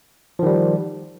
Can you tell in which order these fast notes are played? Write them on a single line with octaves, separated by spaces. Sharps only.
F3 D#3 G3